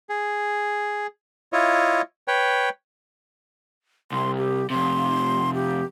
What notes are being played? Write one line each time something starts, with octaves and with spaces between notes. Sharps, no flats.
G#4
E4 F4 C#5 D#5
B4 C#5 G5
C2 C6
G4
F2 C3 C6
G4